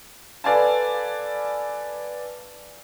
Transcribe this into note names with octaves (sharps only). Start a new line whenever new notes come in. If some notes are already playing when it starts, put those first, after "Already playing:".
A4 B4 D5 F5 G#5 A5